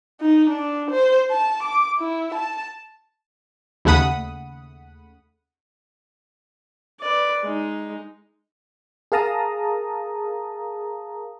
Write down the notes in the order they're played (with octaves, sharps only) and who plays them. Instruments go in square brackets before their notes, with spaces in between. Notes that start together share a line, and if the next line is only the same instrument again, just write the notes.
[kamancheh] D#4
D4
C5
A5
D6
E4
A5
[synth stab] D#2 C#3 A3 F#5 B5 D#6
[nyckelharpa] B4 D5
G#3 D#4
[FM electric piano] G#4 A#4 F5 A5 A#5 D#6